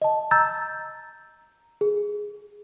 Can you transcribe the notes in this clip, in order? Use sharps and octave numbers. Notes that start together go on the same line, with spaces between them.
D#5 A5
A#5 E6 G6 A6
G#4